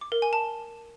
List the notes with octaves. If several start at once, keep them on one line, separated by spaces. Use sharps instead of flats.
D6
A#4
G#5
A5